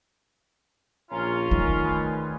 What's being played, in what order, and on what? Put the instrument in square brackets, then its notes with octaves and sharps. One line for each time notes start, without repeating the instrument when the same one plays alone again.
[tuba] A#1 [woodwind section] C#4 F4 [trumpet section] A#5
[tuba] D#3 [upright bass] A3
[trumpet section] G3 G#4 B4